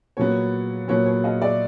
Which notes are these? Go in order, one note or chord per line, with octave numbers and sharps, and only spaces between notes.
A#2 F#3 B3 C#5
A#2 F#3 B3 C#5
C#5
D#5 F5
D5 E5